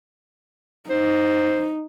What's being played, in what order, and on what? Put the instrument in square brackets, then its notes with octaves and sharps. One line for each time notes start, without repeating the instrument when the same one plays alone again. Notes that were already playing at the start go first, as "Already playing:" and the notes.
[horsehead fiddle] D#4 [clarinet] C5